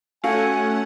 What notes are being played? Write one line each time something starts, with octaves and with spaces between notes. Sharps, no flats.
A3 C#4 F#4 A4 F5 F#5 G#5 C#7